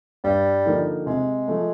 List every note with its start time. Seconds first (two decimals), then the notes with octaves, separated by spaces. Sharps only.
0.24 G2 G3
0.66 D3 F3 A#3 D#4
1.06 C3 G#3
1.48 F3 A3